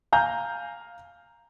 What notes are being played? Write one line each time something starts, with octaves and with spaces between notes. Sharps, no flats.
F5 G#5 A#5 G6